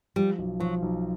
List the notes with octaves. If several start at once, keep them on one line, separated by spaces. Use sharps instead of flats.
F3 G3
B1
F3 F#3
B1